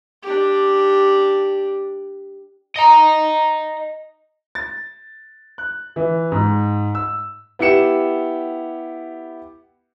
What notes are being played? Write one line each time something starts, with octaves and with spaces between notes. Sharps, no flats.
D4 G4
D#5 A#5
A6
F#6
E3
G#2
E6
B3 E4 G4 C#7 E7